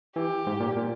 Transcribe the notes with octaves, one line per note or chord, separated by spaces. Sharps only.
E3 G4
G#2
A#2
A#2